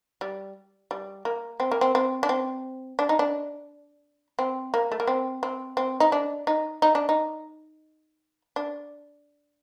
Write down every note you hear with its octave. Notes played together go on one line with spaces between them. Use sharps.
G3
G3
A#3
C4
A#3
C4
C4
D4
C4
D4
D#4
D4
C4
A#3
A3
A#3
C4
C4
C4
D#4
D4
D#4
D#4
D4
D#4
D4